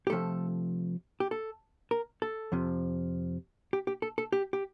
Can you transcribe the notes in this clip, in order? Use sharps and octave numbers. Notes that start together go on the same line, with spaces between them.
G4
C3 F3 A3 A4
G4
A4
A#4
A4
F2 C3 F3
G4
G4
A4
A4
G4
G4